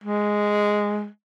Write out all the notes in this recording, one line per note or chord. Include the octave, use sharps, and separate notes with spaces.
G#3